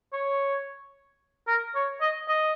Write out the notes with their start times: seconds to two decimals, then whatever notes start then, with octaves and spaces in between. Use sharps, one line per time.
0.13 C#5
1.47 A#4
1.75 C#5
2.01 D#5
2.28 D#5